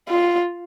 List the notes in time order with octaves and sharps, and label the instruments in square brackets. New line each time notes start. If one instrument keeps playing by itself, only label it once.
[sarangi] F4